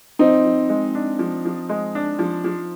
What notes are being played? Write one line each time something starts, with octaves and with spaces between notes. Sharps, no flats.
F3 C4 D#4
F3
G#3
D4
F3
F3
G#3
D4
F3
F3